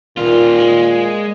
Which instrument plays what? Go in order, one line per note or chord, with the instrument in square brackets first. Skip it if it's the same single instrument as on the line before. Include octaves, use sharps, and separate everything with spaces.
[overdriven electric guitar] D#2 F4 [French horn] A#2
[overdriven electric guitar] G#3